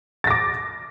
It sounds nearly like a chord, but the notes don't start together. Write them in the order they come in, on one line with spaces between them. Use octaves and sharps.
A6 A#6 D6